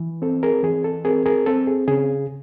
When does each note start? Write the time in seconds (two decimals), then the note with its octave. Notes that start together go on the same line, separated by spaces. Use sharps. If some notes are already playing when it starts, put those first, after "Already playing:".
Already playing: E3
0.22 C4 A4
0.43 G#4 A#4
0.63 E3 G#4
0.84 A4
1.05 C4 G#4 A#4
1.26 G#4 A#4
1.46 C4 A4
1.67 G#4
1.88 C#3 G#4